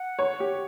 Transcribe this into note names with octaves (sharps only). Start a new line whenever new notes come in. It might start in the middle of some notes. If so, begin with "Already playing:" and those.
Already playing: F#5
C#5
G4